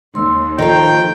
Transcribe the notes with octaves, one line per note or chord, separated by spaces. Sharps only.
D#2 C6 E6
D#3 F3 A4 G5 A#5